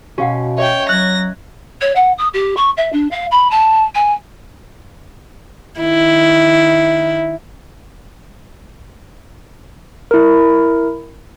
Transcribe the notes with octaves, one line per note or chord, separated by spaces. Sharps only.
B2 C#4 F#4 F5 F#5
C#5 D#5 E5 G5
F#3 F#6 G#6 A#6
C#5
F#5
D#6
G4
C#6
E5
D4
F5
B5
A5
G#5
D#3 E4
E4 A#4